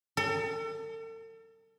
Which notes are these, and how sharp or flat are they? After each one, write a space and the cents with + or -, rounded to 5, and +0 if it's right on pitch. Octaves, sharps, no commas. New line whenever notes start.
A4 +40